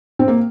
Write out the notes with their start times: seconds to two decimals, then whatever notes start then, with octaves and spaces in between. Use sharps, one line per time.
0.19 C4
0.28 A#3